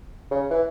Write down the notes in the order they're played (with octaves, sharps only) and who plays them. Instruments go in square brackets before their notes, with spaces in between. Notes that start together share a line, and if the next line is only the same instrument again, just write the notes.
[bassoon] C#3
E3